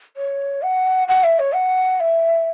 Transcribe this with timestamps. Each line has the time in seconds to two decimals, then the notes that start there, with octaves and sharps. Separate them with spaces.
0.17 C#5
0.63 F#5
1.08 F#5
1.24 E5
1.39 C#5
1.54 F#5
2.00 E5